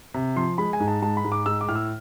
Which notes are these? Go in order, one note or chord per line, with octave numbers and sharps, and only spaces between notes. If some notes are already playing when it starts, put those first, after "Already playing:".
C3
F3 C6
G#3 B5
G#5
G#2
A5
G#3 A5
B5
G#2
D6
G#3 E6
D6
A2 F6
E6